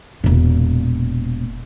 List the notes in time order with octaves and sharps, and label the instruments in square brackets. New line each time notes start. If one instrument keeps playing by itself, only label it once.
[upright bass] E1 A#2